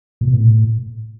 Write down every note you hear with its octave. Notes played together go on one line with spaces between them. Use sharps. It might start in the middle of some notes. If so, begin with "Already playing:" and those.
A#2
B2
A2